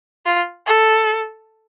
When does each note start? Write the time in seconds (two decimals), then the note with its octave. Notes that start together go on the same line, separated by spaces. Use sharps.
0.26 F4
0.67 A4